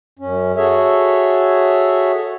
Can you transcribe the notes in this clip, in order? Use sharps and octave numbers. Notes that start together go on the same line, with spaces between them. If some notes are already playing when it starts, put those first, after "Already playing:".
F#2 C#4
F#4 G#4 A4 C#5 E5